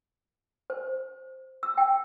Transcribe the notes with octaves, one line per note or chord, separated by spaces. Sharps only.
C5
E6
G5